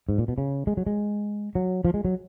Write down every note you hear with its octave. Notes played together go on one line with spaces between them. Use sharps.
G#2
A#2
B2
C#3
G#3
F#3
G#3
F#3
F3
G#3
F#3